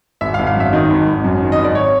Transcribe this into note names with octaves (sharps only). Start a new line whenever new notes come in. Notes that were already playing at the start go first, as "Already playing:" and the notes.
G#1 E5
F5
G#1
F5
F#2
E5
D#3 D#5
G#1
G#1
F#2
D#3
D#5
G#1
D5
C#5